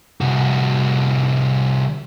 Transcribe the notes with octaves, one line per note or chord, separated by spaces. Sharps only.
C2 F#4